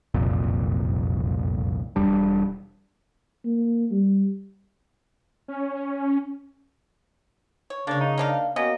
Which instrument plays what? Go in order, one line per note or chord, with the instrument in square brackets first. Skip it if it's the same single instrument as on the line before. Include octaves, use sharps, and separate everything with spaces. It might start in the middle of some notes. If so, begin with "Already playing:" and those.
[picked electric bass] F#1 C2 F2 A#2
E1 G3 D4
[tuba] A#3
G3
[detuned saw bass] C#4
[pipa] C#5
[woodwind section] C#3 [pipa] A#3 C#5 [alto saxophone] D4
[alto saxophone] D#4
[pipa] A#3 D4 F5
[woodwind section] A#3 B3 F#4 [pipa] C#4 [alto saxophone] D#5